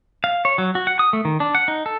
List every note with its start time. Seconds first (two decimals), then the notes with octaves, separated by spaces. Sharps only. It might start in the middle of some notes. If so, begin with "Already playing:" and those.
0.24 F5
0.45 C#5
0.58 F#3
0.75 F#4
0.87 F#5
0.99 D#6
1.13 A3
1.25 D#3
1.40 D4
1.55 F#5
1.68 D#4
1.86 A4